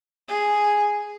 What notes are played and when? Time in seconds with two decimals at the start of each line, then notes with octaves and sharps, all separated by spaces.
0.28 G#4